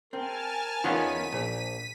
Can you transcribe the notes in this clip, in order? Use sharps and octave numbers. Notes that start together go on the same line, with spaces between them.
C4 A#4 G#5 A5 F6
E2 D#3 B3 C#4 F4 B6 D#7
A#1 A#2